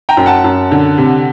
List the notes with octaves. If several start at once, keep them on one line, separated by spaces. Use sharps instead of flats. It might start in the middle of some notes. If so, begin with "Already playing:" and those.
G5 A#5
F#2
F#5 A5
F#2
D3
C3